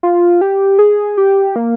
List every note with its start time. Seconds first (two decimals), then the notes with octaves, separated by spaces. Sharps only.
0.03 F4
0.41 G4
0.79 G#4
1.17 G4
1.56 A#3